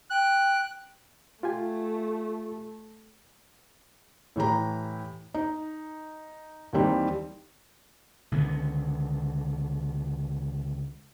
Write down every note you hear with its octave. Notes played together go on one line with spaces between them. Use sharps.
G5 F#6
A3 F4 G4 G#5
A2 E3 G4 A#5
D#4
D#2 D#3 E3 G3 C4 D#4
C#2 D3 D#3 B3